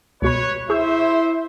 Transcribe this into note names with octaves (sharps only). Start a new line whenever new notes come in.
C#2 B2 B4 C#5 B5
E4 G#4 C5 E5 C#6 G6